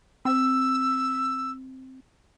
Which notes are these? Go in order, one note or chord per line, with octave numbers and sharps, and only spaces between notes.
C4 E6